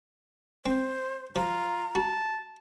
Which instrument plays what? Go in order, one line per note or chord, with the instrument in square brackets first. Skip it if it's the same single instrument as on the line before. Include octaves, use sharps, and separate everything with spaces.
[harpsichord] C4 [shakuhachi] C5
[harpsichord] F3 [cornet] F4 [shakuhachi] A#5
[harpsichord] F#4 [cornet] A5